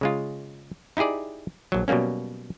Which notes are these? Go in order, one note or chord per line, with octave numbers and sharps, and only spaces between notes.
C#3 G#3 F4
D#4 E4 G4 G#4 D5
A#1 F#3
B2 F#3 G3 A#3 C#4